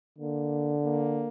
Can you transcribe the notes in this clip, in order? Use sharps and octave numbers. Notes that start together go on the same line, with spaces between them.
D3 A#3
A#3